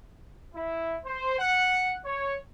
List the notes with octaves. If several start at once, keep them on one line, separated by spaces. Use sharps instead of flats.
E4
C5
F#5
C#5